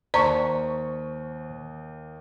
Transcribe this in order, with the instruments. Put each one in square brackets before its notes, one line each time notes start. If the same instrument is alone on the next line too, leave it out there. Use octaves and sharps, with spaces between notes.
[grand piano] D#2 [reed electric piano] C5 A5 C#6 [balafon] D5 A#5